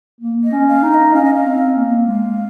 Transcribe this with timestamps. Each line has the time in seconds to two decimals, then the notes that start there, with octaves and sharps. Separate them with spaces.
0.21 A#3
0.44 D#5
0.52 C#4
0.68 F5
0.83 D#4
0.91 F5
0.94 D#5
1.14 C#4 F5
1.24 D#5
1.34 F5
1.46 C4
1.77 A#3
2.07 G#3 F5